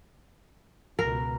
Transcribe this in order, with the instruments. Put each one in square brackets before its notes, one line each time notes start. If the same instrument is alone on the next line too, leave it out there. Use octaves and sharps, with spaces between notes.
[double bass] C#2 B2 [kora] A#4